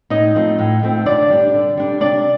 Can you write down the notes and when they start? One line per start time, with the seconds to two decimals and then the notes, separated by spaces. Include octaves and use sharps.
0.10 A2 D#4 D#5
0.35 F3 A3 C4
0.59 A2
0.82 F3 A3 C4
1.06 D3 D4 D5
1.30 G3 D4
1.54 D3
1.77 G3 D4
2.01 C3 D4 D5